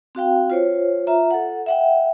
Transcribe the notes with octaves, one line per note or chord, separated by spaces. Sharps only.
C4 F#4 F5 G5
F4 C5 C#5
F4 E5 A#5
A4 F#5
E5 F#5 G5